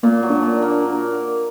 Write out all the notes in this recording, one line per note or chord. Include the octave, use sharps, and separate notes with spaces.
A#2 A#3
F#3
D4
A#2
D4
A#3